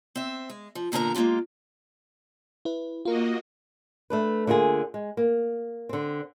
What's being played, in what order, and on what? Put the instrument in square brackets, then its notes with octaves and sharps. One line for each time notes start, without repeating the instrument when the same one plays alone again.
[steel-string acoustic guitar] C4 E5
G#3
F3
E2 A#2 D3 G#4 A#4 A#5
G#3 A#3 D4 F4 G4
[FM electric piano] E4 B4
[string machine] A#3 F#4 D#5 [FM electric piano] F4 A#4
[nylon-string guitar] A3 D4 B4
D3 A#3 E4 F4 G#4
G#3
A#3
D3 C4